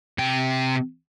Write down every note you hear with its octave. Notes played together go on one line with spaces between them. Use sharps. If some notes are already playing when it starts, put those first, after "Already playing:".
C3 G5